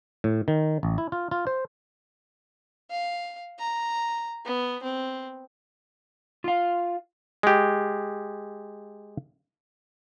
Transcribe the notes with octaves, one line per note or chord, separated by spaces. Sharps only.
A2
D#3
A1
E4
F4
F4
C5
F5
A#5
B3
C4
F4 F5
G#3 G4